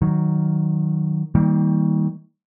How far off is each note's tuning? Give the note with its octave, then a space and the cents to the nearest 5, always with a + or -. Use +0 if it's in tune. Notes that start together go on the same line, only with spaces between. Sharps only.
D#3 +0 F#3 +0
D#3 +35 G3 +5 A#3 -10